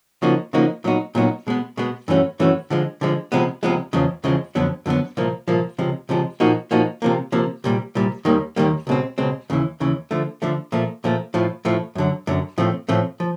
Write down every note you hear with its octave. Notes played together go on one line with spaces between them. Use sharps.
C#3 F3 A#3 D#4 F#4
C#3 F3 A#3 D#4 F#4
A#2 F#3 B3 D#4 F#4
A#2 F#3 B3 D#4 F#4
B2 G#3 B3
B2 G#3 B3
G2 E3 A3 C#4 F#4
G2 E3 A3 C#4 F#4
D3 F3 G#3
D3 F3 G#3
C2 C3 F3 G#3 B3
C2 C3 F3 G#3 B3
E2 C#3 F3 G#3
E2 C#3 F3 G#3
F2 D3 F#3 B3
F2 D3 F#3 B3
C2 A#2 F3 A#3
C2 A#2 F3 A#3
C#2 C3 F3 G#3
C#2 C3 F3 G#3
A#2 F3 A#3 D#4 F#4
A#2 F3 A#3 D#4 F#4
C3 F3 A#3
C3 F3 A#3
C2 A#2 G3
C2 A#2 G3
D#2 D#3 G3 A#3
D#2 D#3 G3 A#3
C#2 B2 G#3 C4
C#2 B2 G#3 C4
D#2 C#3 E3
D#2 C#3 E3
D3 F3 A3
D3 F3 A3
A#2 F3 A3
A#2 F3 A3
A2 F3 A3
A2 F3 A3
F#2 D3 F#3
F#2 D3 F#3
A2 F3 A3 C4
A2 F3 A3 C4
F3